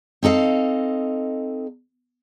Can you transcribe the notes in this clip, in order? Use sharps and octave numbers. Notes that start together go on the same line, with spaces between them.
C4 D#4 A4 D#5 F5